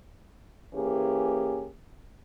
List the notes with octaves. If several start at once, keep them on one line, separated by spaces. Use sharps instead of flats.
E3 A#3 C#4 G4 G#4